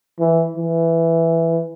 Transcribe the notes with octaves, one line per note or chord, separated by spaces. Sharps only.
E3
E3